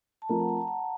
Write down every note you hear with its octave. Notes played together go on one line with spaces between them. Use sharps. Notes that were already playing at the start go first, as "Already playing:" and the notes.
A5
F3 A3 C4 F4 A#4 A#5
F#5
A5
F#5